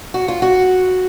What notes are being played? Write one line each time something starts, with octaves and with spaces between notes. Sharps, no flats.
F#4
F4
F#4